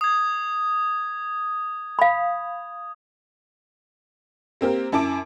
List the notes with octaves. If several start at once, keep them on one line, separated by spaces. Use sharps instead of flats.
D#6 G#6
F5 B5
A#3 C4 G4 A#4
F#2 E4 A5 D6 D7